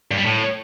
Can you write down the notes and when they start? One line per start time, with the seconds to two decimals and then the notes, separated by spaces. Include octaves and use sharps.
0.11 G2
0.18 G3
0.24 A2